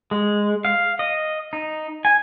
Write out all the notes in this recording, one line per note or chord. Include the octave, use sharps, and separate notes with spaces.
G#3
F5
D#5
D#4
G#5